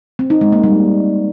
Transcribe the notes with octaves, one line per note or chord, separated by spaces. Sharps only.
C4
D#4
G#3
A#3
G3